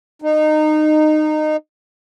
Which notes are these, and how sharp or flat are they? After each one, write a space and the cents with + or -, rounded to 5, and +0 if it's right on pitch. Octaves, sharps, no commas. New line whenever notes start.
D#4 -20